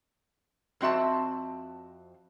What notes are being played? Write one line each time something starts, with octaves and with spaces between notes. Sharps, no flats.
F2 C4 F#4 E5 A5